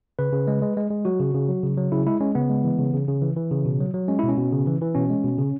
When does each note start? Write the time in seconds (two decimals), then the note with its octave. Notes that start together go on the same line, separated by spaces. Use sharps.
0.19 C#3 B4
0.33 C#3
0.47 G#3
0.62 G#3
0.77 G#3
0.90 G#3
1.05 F#3 F#4
1.20 C#3
1.34 C#3
1.49 F#3
1.63 C#3
1.77 F#3
1.92 C#3 E4
2.06 G#3 E4
2.20 G#3 C#4
2.35 C#3 B3
2.49 G#3
2.64 E3
2.79 C#3
2.93 C#3
3.08 C#3
3.22 E3
3.36 E3
3.51 C#3
3.65 B2
3.80 F#3
3.94 F#3
4.08 G#3 C#4
4.19 B2 E4
4.29 C#4
4.37 B2
4.52 C#3
4.67 E3
4.81 E3
4.95 B2 C#4
5.10 G#3
5.24 B2
5.38 C#3